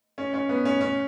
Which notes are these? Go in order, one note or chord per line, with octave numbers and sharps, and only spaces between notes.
C#4
C#4
B3
C#4
C#4